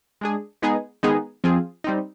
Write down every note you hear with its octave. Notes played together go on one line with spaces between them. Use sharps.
G#3 D4 G#4
G#3 B3 D#4 G#4
D#3 G#3 B3 D#4 G#4
F3 C4 F4 G#4
G3 C4 D#4